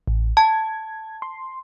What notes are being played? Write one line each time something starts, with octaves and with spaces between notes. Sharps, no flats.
A1
A5 G#6
C6